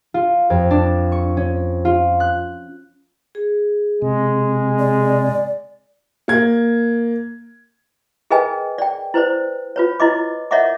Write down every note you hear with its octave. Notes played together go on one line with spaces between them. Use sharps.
F4
F2
D4
C#6
C#4
F4
F#6
G#4
C3 G#3
D5
A#3 G#6
G#4 A#4 B4 D#5 G5 G#5
D5 G5
E4 B4 C5 D5
F4 B4 C#5
E4 B4 D#5 D6
A#4 C#5 D#5 E5 F#5 D6